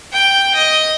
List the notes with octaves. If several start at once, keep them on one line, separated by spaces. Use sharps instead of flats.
G5
D#5